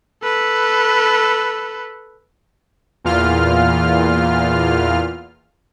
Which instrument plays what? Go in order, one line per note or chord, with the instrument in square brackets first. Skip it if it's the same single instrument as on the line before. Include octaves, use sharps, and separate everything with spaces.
[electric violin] A4 B4
[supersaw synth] E2 A#2 F4 F6